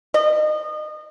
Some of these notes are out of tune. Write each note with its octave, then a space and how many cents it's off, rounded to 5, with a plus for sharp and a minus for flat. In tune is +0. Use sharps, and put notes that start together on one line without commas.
D#5 -30